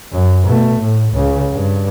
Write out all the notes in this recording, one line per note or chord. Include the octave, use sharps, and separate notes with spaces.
F#2
B2 A3
A2
C#2 C#3
G2